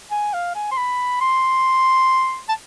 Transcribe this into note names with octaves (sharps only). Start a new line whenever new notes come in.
G#5
F5
G#5
C6
B5
C6
A5